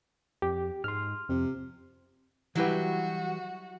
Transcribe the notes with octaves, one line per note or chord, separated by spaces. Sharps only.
F2 G4
G#2 C6 F6
F2 C3
E3 F#3 G3 E4 F#4 G4 B4